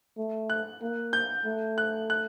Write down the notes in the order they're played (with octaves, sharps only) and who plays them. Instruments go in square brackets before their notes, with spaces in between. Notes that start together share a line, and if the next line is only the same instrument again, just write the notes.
[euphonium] A3
[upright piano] F#6
[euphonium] A#3
[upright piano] G6
[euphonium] A3
[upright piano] F#6
F#6